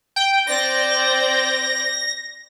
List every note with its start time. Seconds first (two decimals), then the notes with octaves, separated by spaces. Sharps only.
0.16 G5
0.47 C4 D5 G6 A#6